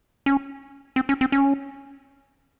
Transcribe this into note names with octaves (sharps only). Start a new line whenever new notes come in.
C#4
C4
C#4
C4
C#4